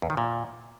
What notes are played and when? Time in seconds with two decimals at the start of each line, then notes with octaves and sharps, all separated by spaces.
0.02 E2
0.10 D#3
0.17 A#2